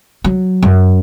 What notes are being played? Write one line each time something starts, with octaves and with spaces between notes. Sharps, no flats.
F#3
F#2